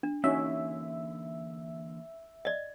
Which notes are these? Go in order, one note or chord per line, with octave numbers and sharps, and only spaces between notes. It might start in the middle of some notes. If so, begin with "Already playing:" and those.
D4
D3 E3 A#3 C#4 D#4 F#4 E5
D5 D#5